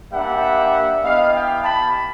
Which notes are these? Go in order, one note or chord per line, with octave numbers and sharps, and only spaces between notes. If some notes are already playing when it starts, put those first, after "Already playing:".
G3 A#3 D4 G4 E5 F#5
B3 E4 G4 D#5 F5
F5 G5
A5 B5